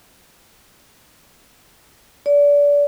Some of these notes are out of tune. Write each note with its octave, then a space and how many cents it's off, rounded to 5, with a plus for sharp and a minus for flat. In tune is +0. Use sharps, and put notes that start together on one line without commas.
D5 -30